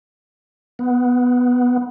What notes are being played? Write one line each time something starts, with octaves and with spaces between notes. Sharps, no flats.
B3